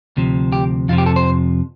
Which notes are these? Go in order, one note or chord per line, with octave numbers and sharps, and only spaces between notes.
D2 C3 F3
G4
F2 C3 F3 F4
G4
A4
C5